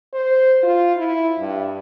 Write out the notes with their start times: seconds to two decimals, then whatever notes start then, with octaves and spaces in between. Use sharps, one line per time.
0.13 C5
0.63 F4
0.96 E4
1.39 G2